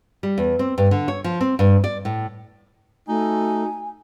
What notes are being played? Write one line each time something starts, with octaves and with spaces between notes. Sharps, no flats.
G3
E2
C4
G2
D3
C#5
F3
C4
G2
D5
A2
A3 D#4 F#4 G#5